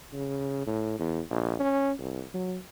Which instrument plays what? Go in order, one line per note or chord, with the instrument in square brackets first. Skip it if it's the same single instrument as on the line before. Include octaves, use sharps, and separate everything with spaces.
[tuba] C#3
A2
E2
A#1
C#4
C2
F#3